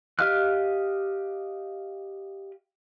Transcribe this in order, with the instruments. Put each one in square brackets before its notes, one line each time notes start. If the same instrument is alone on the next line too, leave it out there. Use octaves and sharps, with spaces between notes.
[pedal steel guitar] G4 D#5 F5 F6 F#6